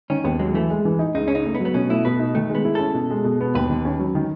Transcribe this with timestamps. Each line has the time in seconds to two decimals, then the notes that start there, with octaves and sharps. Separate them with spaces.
0.10 D#3 C#4
0.24 D#2 B3
0.39 F#3 G#3
0.54 E3 A3
0.70 G#3
0.85 E3
0.99 D#4
1.15 C#2 D#4
1.28 C#4
1.30 C#3 D#4
1.45 A3
1.55 B3
1.60 F#3
1.65 B3
1.74 B2 C#4
1.89 A3 E4
2.05 B2 B4
2.20 D#4
2.35 D#3 A3
2.50 G#3 B3
2.65 E4
2.75 C#4 A4
2.94 B2
3.10 G#3
3.24 B2
3.41 B3
3.55 D#2 B4
3.70 D#3
3.85 C#4
3.99 F#3
4.15 D#3